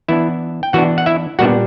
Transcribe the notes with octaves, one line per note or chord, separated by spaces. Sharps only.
E3 B3 D4 E4 E5
G5
E3 B3 D4 F#4 F#5
F#5
E4 E5
A#2 G3 B3 D4 F#4 F#5